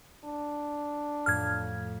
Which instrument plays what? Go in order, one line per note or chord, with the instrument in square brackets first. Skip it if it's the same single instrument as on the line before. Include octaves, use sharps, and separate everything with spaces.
[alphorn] D4
[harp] F2 A2 [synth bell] F6 G#6